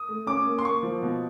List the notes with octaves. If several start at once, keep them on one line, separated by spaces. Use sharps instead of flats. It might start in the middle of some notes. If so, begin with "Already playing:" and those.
Already playing: D#6
A3
C#4 D6
A#3
C6
A#3 C#6
F3
B2